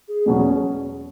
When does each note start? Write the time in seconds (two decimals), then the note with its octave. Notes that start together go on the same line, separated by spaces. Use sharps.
0.08 G#4
0.26 E2 B2 F#3 C#4